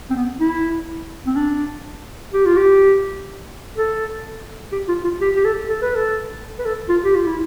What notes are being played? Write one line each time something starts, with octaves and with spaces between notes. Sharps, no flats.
C4
B3
E4
C4
D4
G4
F4
G4
A4
G4
F4
F4
G4
G4
A4
A4
B4
A4
B4
A4
F4
G4
F4
E4